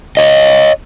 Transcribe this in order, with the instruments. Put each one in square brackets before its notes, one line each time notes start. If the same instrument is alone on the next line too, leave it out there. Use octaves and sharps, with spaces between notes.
[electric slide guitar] C#5 D#5